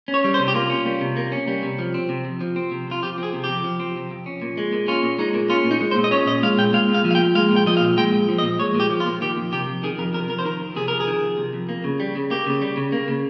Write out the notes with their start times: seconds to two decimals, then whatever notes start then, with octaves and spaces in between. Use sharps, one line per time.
0.08 C#4
0.14 C#5
0.24 G3
0.34 C5
0.39 C3
0.48 G4
0.54 A#3 F4
0.70 C#4
0.86 G3
1.01 C3
1.16 A#3
1.32 C#4
1.48 G3
1.63 C3
1.79 F3
1.94 C4
2.09 C3
2.25 F2
2.41 F3
2.56 C4
2.71 C3
2.87 F2 F4
3.02 F3 G4
3.18 C4 G#4
3.33 C3
3.44 F2 G4
3.64 F3
3.80 C4
3.95 C3
4.11 F2
4.26 C#4
4.42 A#2
4.57 G#3
4.73 A#2
4.88 C#4 F4
5.03 A#2
5.19 G#3 D#4
5.34 A#2
5.50 C#4 F4
5.65 A#2
5.71 D#4
5.81 G#3
5.91 C5
5.96 A#2
6.04 D#5
6.11 C#4 C#5
6.27 A#2 D#5
6.43 G#3 F5
6.58 A#2 G5
6.73 G#3 F5
6.89 A#2
6.94 F5
7.04 F3
7.11 F5
7.15 G5
7.20 A#2
7.35 G#3 F5
7.51 A#2
7.56 G5
7.66 F3 D#5
7.77 F5
7.82 A#2
7.97 G#3 G5
8.13 A#2
8.29 F3
8.38 D#5
8.44 A#2
8.59 G#3 C#5
8.75 A#2 G4
8.90 F3
9.00 F4
9.06 A#2
9.21 D#3 G4
9.37 F2
9.52 C3 G4
9.68 F2
9.83 D#3 G#4
9.98 F2 A#4
10.14 C3 A#4
10.29 F2 A#4
10.39 C5
10.45 D#3 A#4
10.60 F2
10.76 C3 G#4
10.88 F2 A#4
11.00 G#4
11.07 D#3
11.22 F2
11.38 C3
11.53 F2
11.69 A#3
11.84 C#3
12.00 G3
12.15 C#3
12.30 A#3 G4
12.46 C#3
12.62 G3
12.77 C#3
12.92 A#3
13.08 C#3